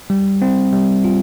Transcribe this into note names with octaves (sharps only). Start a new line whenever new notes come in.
G3
C4
G3
F4